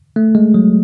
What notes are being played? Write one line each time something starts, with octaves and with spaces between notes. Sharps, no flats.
A3
G#3
F#3